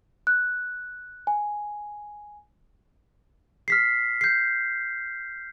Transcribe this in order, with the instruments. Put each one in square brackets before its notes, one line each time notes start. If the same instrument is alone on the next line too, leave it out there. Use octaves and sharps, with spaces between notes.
[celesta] F#6
G#5
[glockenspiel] F6 B6 C7
G6 C7